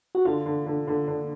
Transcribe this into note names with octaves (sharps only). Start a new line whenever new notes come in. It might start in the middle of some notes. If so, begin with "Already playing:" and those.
F#4
D3 F4
D3
D3
D3
D3